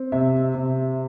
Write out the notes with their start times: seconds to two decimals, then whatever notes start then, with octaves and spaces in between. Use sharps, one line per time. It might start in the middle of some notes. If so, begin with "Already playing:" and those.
Already playing: C4
0.12 C3 E5
0.54 C3